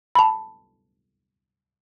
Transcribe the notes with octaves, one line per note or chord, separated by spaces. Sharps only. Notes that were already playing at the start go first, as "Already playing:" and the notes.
A5 B5